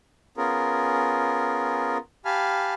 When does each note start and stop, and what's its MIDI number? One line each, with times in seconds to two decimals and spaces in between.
0.37 1.97 59
0.37 1.97 61
0.37 1.97 65
0.37 1.97 68
0.37 1.97 70
2.25 2.74 67
2.25 2.74 77
2.25 2.74 80
2.25 2.74 81
2.25 2.74 83
2.25 2.74 89